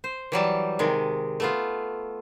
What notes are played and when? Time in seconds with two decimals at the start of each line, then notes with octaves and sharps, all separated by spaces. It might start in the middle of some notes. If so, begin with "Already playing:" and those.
0.04 C5
0.32 E3 F#3 G3 A5
0.79 C3 D#3 G#3
1.40 A3 B3 F4